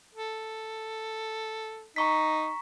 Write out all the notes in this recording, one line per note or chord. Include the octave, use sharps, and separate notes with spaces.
A4
D#4 A#5 C#6 B6